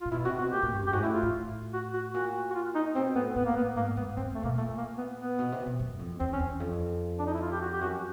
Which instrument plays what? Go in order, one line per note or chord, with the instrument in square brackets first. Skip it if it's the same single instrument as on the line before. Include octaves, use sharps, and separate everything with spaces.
[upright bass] A#2 [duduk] F4
[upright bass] B2 [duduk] E4
[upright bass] C3 [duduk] F#4
[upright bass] B2 [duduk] F#4
[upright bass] A#2 [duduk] G4
[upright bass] A2
G2
[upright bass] F#2 [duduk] G4
[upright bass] G#2 [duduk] F#4
[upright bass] A2 [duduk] E4
[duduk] F4
[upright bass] A2
[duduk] F#4
F#4
[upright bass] A#2 [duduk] F#4
[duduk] F#4
F4
D#4
[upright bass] B2 [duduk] C4
[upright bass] A2 [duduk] B3
[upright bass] A2 [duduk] B3
[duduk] A#3
B3
[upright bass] G#2 [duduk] A#3
[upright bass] G#2 [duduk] B3
[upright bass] F#2 [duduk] C4
[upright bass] F#2 [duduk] A3
[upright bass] B2 [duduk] A#3
[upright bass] A#2 [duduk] A3
[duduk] A#3
B3
B3
[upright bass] B2
C3
B2
F#2
F2
[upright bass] E2 [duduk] C4
[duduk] C#4
[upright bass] E2
F2
[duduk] D4
D#4
E4
F4
G4
F#4
G4
[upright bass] F#2 [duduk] F#4